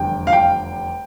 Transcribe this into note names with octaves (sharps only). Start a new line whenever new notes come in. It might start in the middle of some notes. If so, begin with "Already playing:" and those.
Already playing: F1 E2 D3 G3 G5
F5
G5